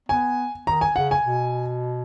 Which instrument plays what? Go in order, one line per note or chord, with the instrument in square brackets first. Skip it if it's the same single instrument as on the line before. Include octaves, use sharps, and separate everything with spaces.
[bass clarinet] B3 [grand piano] G#5
[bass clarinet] D#3 [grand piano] A#5
[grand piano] G#5
[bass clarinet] C#3 [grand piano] F#5
[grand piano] G#5
[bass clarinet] B2